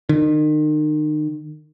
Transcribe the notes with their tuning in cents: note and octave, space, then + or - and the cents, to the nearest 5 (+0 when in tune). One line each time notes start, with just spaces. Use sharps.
D#3 -35